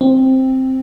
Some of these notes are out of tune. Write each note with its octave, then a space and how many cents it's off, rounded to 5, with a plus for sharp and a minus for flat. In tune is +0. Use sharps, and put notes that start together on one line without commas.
C4 +5